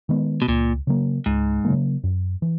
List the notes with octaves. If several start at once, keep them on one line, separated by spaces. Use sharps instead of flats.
D#3 G#3 B3
B2
C#2 A#2
C#3 F#3 A#3
C#2 G#2
C#3 F#3 A#3
F#2
E3